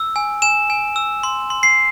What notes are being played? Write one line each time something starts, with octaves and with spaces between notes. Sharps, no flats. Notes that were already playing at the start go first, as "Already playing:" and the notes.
Already playing: E6
G#5
G#5 E7
G#5
E6
C6
C6
C7